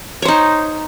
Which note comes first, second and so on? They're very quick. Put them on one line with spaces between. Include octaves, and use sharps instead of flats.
C#5 C5 D#4